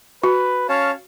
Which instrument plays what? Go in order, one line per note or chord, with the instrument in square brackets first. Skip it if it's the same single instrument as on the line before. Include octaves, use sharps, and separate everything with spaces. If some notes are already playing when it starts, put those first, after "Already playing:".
[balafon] F#4 [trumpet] B4
[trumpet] C#4 [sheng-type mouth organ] C#5 F5 A5